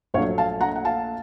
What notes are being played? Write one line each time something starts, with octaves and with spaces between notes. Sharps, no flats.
A#1 A#2 F#3 A3 C#5 F5
F5 A5
F#5 A#5
F#5
F5 A5